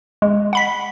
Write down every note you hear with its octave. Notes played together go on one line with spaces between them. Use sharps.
G#3
F#5 B5 B6